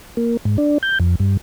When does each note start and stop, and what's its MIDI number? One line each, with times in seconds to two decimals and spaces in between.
0.17 0.37 58
0.45 0.57 44
0.58 0.78 62
0.83 0.99 91
1.00 1.15 41
1.20 1.37 43